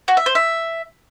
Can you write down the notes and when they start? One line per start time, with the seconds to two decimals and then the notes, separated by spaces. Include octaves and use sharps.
0.08 F#4
0.17 E5
0.26 C5
0.35 E5